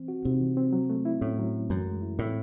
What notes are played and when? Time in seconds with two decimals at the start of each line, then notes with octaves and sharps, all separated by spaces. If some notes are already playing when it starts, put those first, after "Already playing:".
Already playing: E3 C4
0.08 F#4
0.25 C3 D#4
0.40 E3
0.57 C4
0.73 F#3
0.90 A3
1.05 E4
1.21 A2 C#4
1.38 F#3
1.54 A3
1.70 F#2 E3
1.86 G#3
2.02 E4
2.19 A2 C4